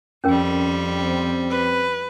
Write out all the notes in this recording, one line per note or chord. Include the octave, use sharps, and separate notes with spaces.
F2 G3 C#4 A#4 G5
C4
B4